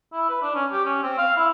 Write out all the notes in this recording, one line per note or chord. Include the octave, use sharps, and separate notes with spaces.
E4
B4
D4
C#4
G4
C#4
C4
F5
E4